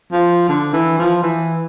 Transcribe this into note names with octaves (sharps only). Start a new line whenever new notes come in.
F3
D3
E3
F3
E3